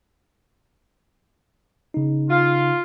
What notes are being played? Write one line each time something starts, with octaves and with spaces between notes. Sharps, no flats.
C#3 D#4
F4